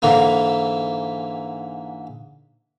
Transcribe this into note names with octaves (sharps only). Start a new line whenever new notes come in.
G#2 D3 E3 A#3